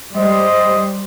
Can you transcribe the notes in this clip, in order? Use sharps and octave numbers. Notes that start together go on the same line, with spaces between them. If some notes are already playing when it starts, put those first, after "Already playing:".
G3 C5 D#5